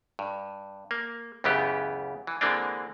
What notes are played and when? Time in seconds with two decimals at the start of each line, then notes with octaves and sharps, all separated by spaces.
0.19 G2
0.91 A#3
1.44 C#2 F#2 C#3 E3 B3 G4
2.27 E3
2.41 D3 E3 G#3 A#3 C4 D4